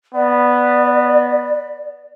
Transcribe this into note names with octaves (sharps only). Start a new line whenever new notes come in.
B3 D5